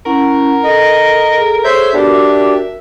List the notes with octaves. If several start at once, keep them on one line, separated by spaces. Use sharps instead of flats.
C#4 E4 A#4 F#5
A4 D#5
G#4 A4
C5 C#5 E5 G6
B3 D4 F#4 G4 A#4
E5